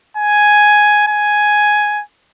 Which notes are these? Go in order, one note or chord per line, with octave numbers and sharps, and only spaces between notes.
G#5
G#5